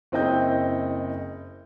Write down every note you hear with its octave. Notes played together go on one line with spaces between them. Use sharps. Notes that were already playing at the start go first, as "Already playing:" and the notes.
F#1 C4 E4 D#5 G5 G6